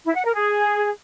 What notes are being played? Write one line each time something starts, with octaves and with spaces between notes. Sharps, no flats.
E4
F#5
A#4
G#4